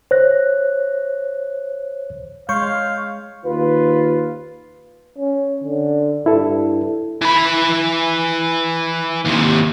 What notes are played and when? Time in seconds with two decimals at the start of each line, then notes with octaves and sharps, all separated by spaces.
0.11 C5 C#5 F#6 A#6
2.49 G#3 C#5 F5 C6 C#6 G6
3.45 D#2 F4 B4
5.18 C#4
5.64 D3
6.26 G2 E4 A4
7.21 E3 B5
9.25 D#2 C3